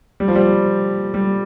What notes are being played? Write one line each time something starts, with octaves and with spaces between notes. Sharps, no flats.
G3
F3
G3
G3